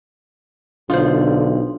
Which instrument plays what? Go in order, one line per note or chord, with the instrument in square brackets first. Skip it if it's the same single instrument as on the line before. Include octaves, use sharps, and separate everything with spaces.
[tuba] B1 [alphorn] D3 [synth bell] D4 F5 [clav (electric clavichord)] F4 C5